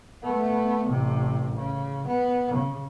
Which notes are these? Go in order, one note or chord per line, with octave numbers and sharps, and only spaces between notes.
A3 B3
A1 C3
C#3
B3
C#3